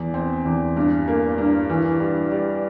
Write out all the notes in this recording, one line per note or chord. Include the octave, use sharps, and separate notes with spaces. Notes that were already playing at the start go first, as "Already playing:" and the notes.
Already playing: E2
C4
E2
G2
A#3
G2
E3
G3
G3